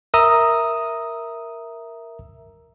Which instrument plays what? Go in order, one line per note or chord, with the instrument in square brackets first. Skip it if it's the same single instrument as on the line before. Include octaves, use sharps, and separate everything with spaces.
[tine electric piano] A#4 E5 A#5 D#6 E6